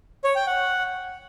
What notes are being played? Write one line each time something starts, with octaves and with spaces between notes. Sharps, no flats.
C#5
G5
F#5